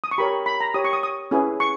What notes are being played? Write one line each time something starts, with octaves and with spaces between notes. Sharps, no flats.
D#6
C#6
G4 A#4 C#5 B5
B5
A#5
G4 C#5 D#6
C#6
D#6
D#6
C#4 E4 G#4 B4
C#6